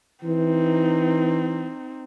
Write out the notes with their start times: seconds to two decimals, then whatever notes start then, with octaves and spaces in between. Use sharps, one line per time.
0.24 E3 C4 D#4